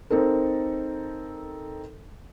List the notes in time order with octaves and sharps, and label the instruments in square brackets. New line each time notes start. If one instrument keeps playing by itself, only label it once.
[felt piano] C4 D#4 A4 A#4